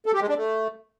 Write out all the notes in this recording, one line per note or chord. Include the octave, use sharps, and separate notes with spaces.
A4
G4
G#3
D4
A3